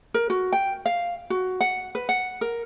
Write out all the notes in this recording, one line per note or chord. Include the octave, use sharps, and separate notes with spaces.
A#4
F#4
G5
F5
F#4
F#5
B4
F#5
A#4